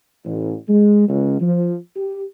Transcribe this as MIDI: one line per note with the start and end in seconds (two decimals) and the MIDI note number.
0.25 0.54 33
0.68 1.07 56
1.09 1.37 37
1.41 1.76 53
1.96 2.22 67